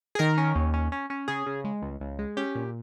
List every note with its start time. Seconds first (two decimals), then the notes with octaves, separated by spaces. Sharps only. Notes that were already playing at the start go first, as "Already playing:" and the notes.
0.15 G#4
0.19 D#3 A#4
0.37 C#4
0.55 D#2
0.74 C#4
0.92 C#4
1.10 C#4
1.28 C#3 G#4
1.47 C#3
1.64 G#3
1.82 C#2
2.00 C#2
2.19 G#3
2.37 C#4 G4
2.55 A#2